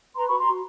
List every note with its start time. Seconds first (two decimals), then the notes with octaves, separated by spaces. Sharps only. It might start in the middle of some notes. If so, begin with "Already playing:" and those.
0.16 B4 A#5 C6
0.27 F#4 B5 C#6
0.39 A#5 C6
0.47 F#4